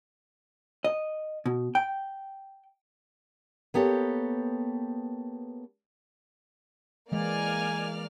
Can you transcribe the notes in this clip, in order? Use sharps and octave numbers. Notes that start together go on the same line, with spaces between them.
D#5
B2
G5
A#3 B3 G4 A4 C#5
E3 G#3 A#3 D5 G#5 F6